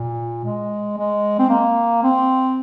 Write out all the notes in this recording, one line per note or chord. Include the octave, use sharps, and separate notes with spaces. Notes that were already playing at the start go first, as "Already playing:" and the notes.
Already playing: A#2
G#3
G#3
C4
A#3
C4